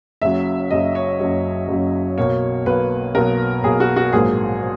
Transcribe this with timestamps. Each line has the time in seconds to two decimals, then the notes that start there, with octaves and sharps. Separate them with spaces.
0.22 F#1 F#2 C#3 F#3 E5
0.71 F#1 F#2 C#3 F#3 D#5
0.95 C#5
1.20 F#1 F#2 C#3 F#3
1.68 F#1 F#2 C#3 F#3
2.17 B1 B2 A#3 C#5
2.66 B1 B2 A#3 B4
3.15 B1 B2 A#3 A#4
3.63 B1 B2 A#3 G#4
3.80 F#4
3.96 F#4
4.13 A#1 G#2 F#3 A#3 G#4